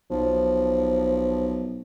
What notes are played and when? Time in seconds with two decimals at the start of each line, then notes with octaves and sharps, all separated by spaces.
0.10 B1 F3